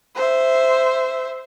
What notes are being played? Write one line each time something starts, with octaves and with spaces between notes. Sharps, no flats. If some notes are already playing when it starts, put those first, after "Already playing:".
C5 E5